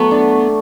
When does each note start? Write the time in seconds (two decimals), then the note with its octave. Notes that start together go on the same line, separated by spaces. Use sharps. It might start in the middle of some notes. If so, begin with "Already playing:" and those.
Already playing: F#3 A3 B3
0.11 D4